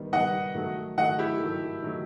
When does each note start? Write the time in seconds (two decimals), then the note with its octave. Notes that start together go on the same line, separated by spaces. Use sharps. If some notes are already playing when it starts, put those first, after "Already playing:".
Already playing: D#3 G3 B3 D#4
0.12 D#3 G3 B3 D#4 D#5 F#5
0.55 D#3 F#3 A3
0.97 D#3 F#3 A3 D#5 F#5
1.19 E4 G4
1.40 D#3 F#3 A3
1.83 D#3 F#3 A3